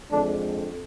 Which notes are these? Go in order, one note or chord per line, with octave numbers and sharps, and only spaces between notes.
F2 D3 G#3 C4 D4